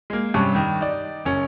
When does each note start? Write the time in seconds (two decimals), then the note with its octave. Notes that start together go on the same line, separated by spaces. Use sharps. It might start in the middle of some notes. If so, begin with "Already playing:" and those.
0.10 G#3 A#3
0.34 G2 C3 C#4 A5 C#6
0.55 G2 D#3
0.81 D#4 D5
1.25 F#1 C#4